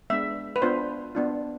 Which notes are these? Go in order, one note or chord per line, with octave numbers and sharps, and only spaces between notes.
G#3 B3 D4 E5
B4
B3 D4 F4 C5
B3 D4 F4